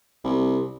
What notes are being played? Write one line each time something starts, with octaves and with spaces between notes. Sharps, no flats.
C2